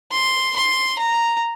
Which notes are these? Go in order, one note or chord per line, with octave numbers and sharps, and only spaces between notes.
C6
C6
A#5